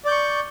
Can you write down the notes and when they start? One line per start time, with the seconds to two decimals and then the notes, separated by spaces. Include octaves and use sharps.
0.05 D5
0.08 G6
0.11 C#6